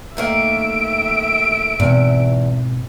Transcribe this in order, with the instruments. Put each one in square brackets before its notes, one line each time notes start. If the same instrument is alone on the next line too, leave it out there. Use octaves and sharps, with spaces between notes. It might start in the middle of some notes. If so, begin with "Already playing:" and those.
[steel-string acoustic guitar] D#3 A3 A#3 [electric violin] E5 D7
[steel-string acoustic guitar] E2 [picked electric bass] G#2 B2 C4